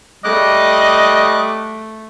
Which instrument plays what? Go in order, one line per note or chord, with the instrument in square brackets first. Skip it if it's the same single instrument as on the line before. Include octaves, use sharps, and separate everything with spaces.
[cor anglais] G3 [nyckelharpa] A3 [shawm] D#5 [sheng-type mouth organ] D6 F#6